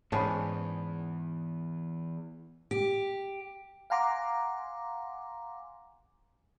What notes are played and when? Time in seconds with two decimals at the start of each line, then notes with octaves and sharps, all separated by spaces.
0.12 E2 G#2 B3 C#4 D5 A5 B5
2.71 G4
3.90 F5 F#5 G#5 A#5 C6 D6